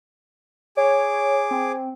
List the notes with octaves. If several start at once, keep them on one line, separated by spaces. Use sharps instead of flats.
G#4 C#5 D6
C4